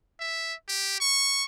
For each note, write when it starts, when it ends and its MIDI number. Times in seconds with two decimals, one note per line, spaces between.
0.20 0.54 76
0.69 1.00 67
1.00 1.44 85